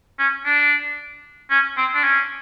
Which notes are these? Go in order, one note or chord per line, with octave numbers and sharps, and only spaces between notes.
C#4
D4
C#4
C4
D4
C#4